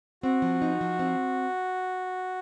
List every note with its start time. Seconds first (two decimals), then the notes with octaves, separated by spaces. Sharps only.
0.23 C4 F#4
0.42 F3
0.62 D#4
0.81 F3
0.99 C4